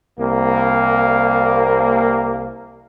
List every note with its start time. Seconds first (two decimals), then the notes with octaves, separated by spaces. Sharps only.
0.19 C2 A#3